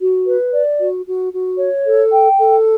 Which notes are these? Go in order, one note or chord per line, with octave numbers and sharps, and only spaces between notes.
F#4
B4
D5
F#4
F#4
F#4
C#5
A4
G5
A4